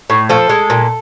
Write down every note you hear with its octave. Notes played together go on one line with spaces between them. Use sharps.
A2
F3 A4
G#3
A#2